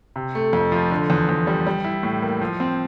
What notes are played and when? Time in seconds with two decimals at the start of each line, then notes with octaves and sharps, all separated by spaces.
0.16 C3
0.35 A3
0.53 F2
0.72 F3
0.91 D3
1.10 E2
1.29 E2
1.47 G3
1.67 G3
1.84 E4
2.03 A2
2.22 A#3
2.41 F3
2.60 C4